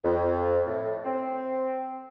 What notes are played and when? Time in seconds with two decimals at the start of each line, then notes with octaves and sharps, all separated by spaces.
0.04 F2
0.67 A2
1.05 C4